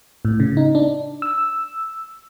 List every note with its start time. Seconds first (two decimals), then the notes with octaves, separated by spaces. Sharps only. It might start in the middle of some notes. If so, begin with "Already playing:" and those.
0.25 A2
0.40 C#3
0.57 D#4
0.75 D4
1.22 E6